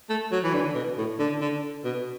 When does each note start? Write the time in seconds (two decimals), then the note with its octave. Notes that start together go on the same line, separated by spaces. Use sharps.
0.10 A3
0.32 F#3
0.44 E3
0.54 D3
0.75 B2
0.98 A2
1.19 D3
1.41 D3
1.84 B2